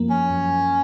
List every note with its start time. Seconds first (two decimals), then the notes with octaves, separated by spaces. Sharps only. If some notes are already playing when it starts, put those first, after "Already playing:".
Already playing: F#2 F3 A#3
0.10 C#4
0.30 F#2